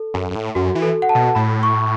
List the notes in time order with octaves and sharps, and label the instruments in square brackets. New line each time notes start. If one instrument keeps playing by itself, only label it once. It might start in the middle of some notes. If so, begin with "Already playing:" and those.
Already playing: [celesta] A4
[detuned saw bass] F#2
F#2
A2
[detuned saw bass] F#2 [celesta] F#4
[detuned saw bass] E3
[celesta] A4
F#5
A5
[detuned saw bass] B2
[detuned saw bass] A2 [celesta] B5
[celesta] C#6